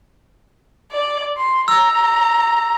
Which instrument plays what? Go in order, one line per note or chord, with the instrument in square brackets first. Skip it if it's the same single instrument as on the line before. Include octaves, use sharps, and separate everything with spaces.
[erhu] D5
C6
[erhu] A#5 [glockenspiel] E6